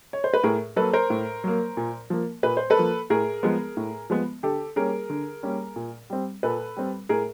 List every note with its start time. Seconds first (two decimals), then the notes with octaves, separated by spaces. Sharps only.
0.13 C#5
0.24 C5
0.34 B4
0.43 A2 G#4 A#4
0.76 F#3 A#3 A4 B4
0.93 A#4 C5
1.10 A2
1.44 F#3 A#3
1.77 A#2
2.10 F3 A#3
2.43 A#2 B4
2.57 C5
2.70 A4 B4
2.77 F3 A#3
3.10 A2 G#4 A#4
3.43 F3 G#3 B3
3.77 A2
4.10 F3 G#3 B3
4.43 D3 G4 A4
4.76 G3 A#3 C#4 G#4 A#4
5.10 D3
5.43 G3 A#3 C#4
5.76 A#2
6.10 G3 C4
6.43 A#2 A4 B4
6.77 G3 C4
7.09 A2 G#4 A#4